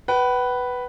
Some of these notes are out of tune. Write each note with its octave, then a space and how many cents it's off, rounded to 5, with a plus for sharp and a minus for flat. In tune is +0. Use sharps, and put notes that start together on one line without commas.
B4 +0 F#5 +45